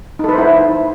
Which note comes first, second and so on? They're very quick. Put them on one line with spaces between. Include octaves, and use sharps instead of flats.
D#4 A4 B4 C5 E4